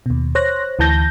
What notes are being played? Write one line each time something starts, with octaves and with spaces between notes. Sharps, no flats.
D#2 B2
C5 C#5 F#6 A#6
D2 E3 A5 G6 A#6